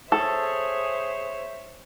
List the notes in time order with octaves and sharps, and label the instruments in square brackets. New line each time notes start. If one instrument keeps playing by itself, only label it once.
[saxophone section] G#4 [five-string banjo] A4 [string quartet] C5 E5 [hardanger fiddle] C#5